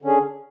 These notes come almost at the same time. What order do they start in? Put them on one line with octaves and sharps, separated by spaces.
D3 C#4 G#4